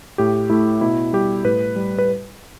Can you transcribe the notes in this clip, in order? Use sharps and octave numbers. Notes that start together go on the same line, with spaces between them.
A2 G4
A3 E4
B2 E4
G3 G4
A2 B4
G3
B4